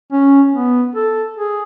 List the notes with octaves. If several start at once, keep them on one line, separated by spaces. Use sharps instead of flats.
C#4
B3
A4
G#4